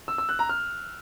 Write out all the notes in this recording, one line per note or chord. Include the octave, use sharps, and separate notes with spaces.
E6
E6
F#6
A#5
F6